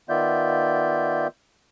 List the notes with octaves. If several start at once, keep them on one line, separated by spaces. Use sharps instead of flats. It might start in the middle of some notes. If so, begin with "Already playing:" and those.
D#3 B3 F4 D5 E5 G6